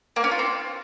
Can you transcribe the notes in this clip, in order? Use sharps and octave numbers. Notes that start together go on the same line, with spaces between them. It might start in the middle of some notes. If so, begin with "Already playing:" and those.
A#3
C#4
F4
C4